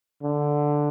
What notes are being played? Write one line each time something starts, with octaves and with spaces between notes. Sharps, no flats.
D3